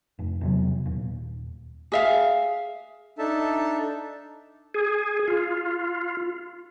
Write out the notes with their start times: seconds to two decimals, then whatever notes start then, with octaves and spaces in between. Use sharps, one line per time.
0.19 F1
0.41 E2 C3 F#3
0.86 D#1
1.92 G#4 E5 F5
3.18 D4 D#4 A4 E5 A5
4.74 G#4
5.28 F4